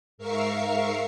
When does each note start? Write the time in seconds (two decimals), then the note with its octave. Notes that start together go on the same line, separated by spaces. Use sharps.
0.18 G#2 A#4 E5 F5 C#6 C7